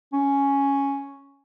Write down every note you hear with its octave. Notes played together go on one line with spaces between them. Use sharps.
C#4